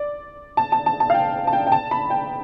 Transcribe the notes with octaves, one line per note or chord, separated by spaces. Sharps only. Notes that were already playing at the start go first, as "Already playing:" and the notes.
Already playing: D5
A5
A5
A5
A5
F5
G5
A5
G5
G5
A5
B5
G5